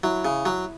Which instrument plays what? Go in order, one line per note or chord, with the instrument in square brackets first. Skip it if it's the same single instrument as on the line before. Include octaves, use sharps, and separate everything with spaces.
[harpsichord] F#3 [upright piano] E4
[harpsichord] C#3
F#3